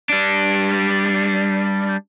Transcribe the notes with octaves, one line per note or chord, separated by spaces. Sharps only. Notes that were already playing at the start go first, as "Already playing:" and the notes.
G3 D4